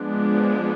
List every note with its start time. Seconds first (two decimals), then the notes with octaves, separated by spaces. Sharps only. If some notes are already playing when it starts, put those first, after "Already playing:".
Already playing: F3 G#3 B3 D4